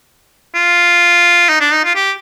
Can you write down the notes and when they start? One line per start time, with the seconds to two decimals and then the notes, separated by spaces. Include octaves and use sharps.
0.55 F4
1.49 D#4
1.60 D4
1.73 D#4
1.84 F4
1.95 G4